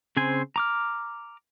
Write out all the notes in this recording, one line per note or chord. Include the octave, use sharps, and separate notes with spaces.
C#3 C4 C5 G#5
A#5 D6 F6